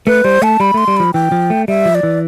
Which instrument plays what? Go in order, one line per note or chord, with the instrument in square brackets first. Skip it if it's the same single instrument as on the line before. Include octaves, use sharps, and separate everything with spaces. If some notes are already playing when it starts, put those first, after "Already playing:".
[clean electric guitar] A3 [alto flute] B4
[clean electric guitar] G3 [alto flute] C5
[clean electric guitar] A3 [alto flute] A5
[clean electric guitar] G3 [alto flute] B5
[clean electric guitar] A3 [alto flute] C6
[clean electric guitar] G3
[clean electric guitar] F3 [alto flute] B5
[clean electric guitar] E3 [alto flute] G5
[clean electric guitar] F3
A3
[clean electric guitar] G3 [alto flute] E5
[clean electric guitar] F3
[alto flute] D5
[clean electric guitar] E3